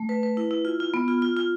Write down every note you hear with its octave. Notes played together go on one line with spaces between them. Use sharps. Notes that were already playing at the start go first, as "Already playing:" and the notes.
Already playing: A3
B4
B4
E4
E4
F4
F4
B3
F4
F4
F4